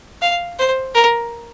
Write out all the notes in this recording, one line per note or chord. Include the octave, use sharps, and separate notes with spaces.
F5
C5
A#4